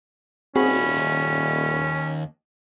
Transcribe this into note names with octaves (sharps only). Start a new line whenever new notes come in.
D#1 D#2 C4 C#4 F#4 G#4 B5